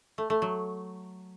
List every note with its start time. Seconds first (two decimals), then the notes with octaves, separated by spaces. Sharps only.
0.18 A3
0.30 A3
0.42 F#3